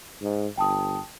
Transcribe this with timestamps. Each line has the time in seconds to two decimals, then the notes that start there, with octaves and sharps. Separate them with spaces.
0.22 G#2
0.57 G1 G5 A5 D#6